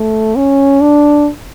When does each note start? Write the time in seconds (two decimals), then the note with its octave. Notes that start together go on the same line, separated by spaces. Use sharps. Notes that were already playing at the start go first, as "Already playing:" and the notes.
Already playing: A3
0.36 C#4
0.81 D4